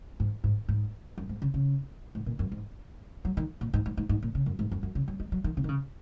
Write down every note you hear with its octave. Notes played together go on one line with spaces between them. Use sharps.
G#2
G#2
G#2
F#2
G#2
C#3
C#3
G#2
A#2
F#2
G#2
F#3
D#3
A#2
G#2
G#2
G#2
G#2
A#2
C#3
F#2
G#2
F#2
F#2
C#3
F#3
G#3
F#3
D#3
C#3
D#3
C#3